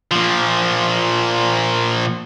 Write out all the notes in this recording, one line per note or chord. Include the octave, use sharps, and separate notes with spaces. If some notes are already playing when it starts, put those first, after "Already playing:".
A#2 F3